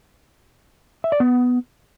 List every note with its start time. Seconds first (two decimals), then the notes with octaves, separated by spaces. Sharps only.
1.04 E5
1.12 D5
1.20 B3